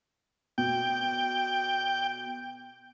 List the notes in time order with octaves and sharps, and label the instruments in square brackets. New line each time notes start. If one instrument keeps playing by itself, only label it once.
[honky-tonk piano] B2 [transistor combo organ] G5